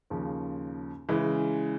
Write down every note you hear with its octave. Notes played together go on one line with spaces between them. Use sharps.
D#2 C#3 F3
C#3 E3 G#3